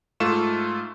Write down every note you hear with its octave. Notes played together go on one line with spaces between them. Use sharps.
G#2 A3 F4 C#6 E7